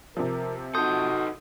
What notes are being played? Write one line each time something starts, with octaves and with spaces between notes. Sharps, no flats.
C3 F3 A#4
D#4 F#4 A4 C6 D#6 G6